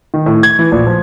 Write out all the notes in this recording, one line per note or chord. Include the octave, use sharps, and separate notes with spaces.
D#3
A2
G#6
E3
A#1
F3